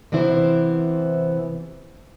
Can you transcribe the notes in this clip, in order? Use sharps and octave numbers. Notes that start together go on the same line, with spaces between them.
C3 E3 B3 E4 C5